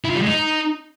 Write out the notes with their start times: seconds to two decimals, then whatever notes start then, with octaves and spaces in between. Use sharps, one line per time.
0.04 E4
0.10 F4
0.16 G3
0.21 G#3
0.27 D#4